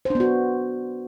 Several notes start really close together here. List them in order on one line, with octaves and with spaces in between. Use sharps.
C5 D4 B3 F#4